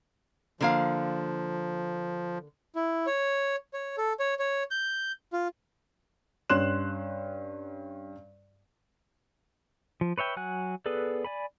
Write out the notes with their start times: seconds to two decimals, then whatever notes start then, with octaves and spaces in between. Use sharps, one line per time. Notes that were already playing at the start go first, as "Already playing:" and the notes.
0.61 D3 F3 A#3 F5
2.75 E4
3.06 C#5
3.73 C#5
3.98 A4
4.20 C#5
4.39 C#5
4.71 G6
5.33 F4
6.50 G2 C#4 C6 F#6 E7
10.01 F3
10.18 B4 C#5 E5 G5
10.37 F#3 F#5 G#5 F#6
10.86 B3 G#4 A4 B4 D5
11.25 D5 G#5 B5